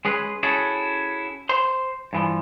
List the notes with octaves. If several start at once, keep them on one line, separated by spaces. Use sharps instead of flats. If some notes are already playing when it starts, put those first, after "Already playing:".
G#3 C#4 G#4 B4
C#4 E4 F#4 G#4 A4
C5 C6
G2 E3 F3